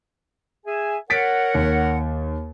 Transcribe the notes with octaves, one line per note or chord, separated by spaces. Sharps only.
G#4 E5 G#5
A#4 C#5 F#5 A6 B6 D7
D#2